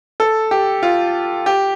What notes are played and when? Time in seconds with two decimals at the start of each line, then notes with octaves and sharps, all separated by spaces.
0.20 A4
0.51 G4
0.83 F4
1.46 G4